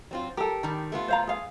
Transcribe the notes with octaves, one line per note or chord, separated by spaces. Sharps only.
F#3 C4 F4
G4 A4 A#4
D#3 G3
A3 B3 F4
C5 F5 A#5
G#4 F5